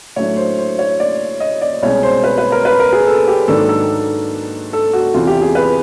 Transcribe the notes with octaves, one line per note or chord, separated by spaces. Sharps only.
A2 F#3 A3 D4 C#5
C5
C5
C#5
D5
D#5
D5
C2 B2 G#3 C#4 C#5
C5
B4
B4
A#4
B4
A#4
G#4
A4
G4
G#2 D#3 F#3 A#3 D4 A4
A4
A4
F#4
E2 C3 E3 F4
G4
G#4
B4